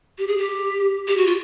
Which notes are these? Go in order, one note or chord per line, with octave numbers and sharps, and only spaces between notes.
G4
G#4
G4
G4
F#4
F4